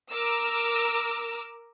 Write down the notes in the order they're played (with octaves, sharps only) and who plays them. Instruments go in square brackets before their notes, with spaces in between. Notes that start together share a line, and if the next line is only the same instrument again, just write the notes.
[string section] A#4 D6 E6 F6